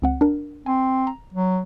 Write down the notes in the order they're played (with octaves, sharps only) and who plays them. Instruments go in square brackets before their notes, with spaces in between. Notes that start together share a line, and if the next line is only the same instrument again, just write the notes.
[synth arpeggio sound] C#2 C4 F#5
D4 A#4
[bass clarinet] C4 [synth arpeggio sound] G#5
[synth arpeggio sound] A#5
[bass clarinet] F#3